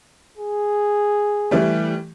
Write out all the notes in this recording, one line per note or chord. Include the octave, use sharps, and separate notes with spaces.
G#4
E3 G3 A3